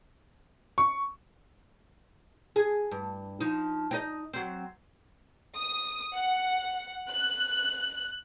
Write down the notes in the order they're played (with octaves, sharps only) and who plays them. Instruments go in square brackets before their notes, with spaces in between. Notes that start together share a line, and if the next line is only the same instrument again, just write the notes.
[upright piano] C#6
[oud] G#4
G2
F3 D#4
C4 D#4 D#5
F#3 C4
[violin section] D#6
F#5
F#6